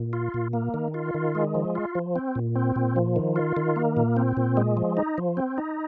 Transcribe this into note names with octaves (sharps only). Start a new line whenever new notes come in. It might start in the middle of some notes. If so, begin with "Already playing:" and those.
Already playing: A#2
F4
A#2
A#3
D#3
F4
D#3
G#3
F3
F4
F3
C4
A#2
C4
A#2
F3
D#3
F4
D#3
A#3
A#2
C4
A#2
G#3
F3
D#4
F3
C4
D#4